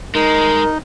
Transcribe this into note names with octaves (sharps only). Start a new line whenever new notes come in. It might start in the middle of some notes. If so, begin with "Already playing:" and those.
G#3 D#4 A#4